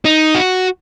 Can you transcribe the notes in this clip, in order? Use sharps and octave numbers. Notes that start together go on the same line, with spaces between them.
D#4
F#4